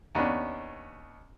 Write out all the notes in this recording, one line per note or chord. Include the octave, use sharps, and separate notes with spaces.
D#2 B3 C#4 D4